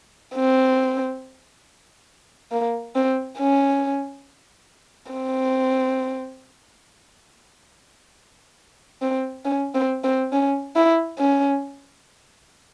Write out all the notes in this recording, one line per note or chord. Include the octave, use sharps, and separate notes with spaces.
C4
A#3
C4
C#4
C4
C4
C#4
C4
C4
C#4
E4
C#4